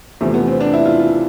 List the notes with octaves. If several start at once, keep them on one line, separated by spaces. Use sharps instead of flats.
E2 C3 F3 A3
B3
C4
D4
E4
F4
F4